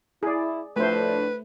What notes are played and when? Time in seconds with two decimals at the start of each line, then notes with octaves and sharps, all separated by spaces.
0.23 E4 G#4 D5
0.76 A2 F3 A3 D4 B4 C5